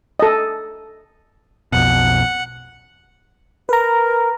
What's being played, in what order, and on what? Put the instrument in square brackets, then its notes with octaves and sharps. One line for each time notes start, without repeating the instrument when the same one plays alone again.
[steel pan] A4 D#5
[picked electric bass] B1 F2 B2 [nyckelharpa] F#5
[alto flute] A#4 [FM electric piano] B4 A#5